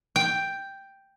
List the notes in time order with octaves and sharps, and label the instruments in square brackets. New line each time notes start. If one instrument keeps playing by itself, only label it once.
[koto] G5